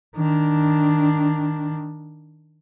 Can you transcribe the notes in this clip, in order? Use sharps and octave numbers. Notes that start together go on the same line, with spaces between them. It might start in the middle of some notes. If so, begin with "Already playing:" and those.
D#3 D4